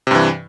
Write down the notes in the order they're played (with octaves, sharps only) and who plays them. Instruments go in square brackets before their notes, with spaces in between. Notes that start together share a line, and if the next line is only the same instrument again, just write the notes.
[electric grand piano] C3
G2
E3